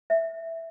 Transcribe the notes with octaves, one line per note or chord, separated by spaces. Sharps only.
E5